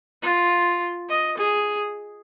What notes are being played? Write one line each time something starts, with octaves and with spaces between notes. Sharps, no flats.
F4
D#5
G#4